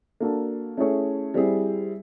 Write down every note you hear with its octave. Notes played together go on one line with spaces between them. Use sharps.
A#3 D4 F#4 A4
A3 C#4 E4 G#4 C#5
G3 C4 E4 G#4